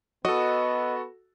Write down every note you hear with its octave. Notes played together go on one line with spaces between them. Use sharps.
B3 F#4 A4 D#5